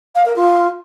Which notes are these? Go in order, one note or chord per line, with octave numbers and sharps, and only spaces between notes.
F5
A#4
F4